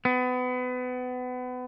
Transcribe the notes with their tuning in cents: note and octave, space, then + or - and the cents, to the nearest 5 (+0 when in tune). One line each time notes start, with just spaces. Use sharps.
B3 +30